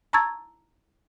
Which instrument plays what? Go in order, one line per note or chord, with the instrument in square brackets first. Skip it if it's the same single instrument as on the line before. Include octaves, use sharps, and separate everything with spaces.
[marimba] A5 A#5 C#6 E6 G#6 A6